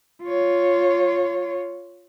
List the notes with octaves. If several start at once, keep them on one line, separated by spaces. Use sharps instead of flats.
F4 C#5